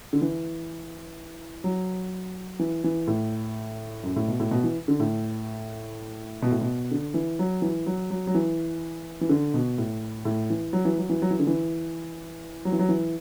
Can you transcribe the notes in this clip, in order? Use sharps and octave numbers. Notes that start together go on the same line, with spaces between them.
D3
E3
F#3
E3
E3
A2
F#2
A2
B2
A2
B2
E3
D3
A2
B2
A2
B2
D3
E3
F#3
E3
F#3
F#3
F#3
E3
E3
D3
B2
A2
A2
E3
F#3
E3
F#3
E3
F#3
E3
D3
E3
F#3
E3
F#3
E3